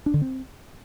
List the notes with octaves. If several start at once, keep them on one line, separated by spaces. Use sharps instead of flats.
D4
D3
C4